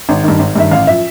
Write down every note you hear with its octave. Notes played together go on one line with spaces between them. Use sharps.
G#1
G2 D#3
G#1
G2 D#3 E5
A1 F5
F3 E5